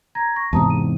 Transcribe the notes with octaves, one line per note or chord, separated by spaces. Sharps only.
A#5 G#6 A#6
C#6 A#6
E2 G#2 C3 A5 A#5 D#6
D#7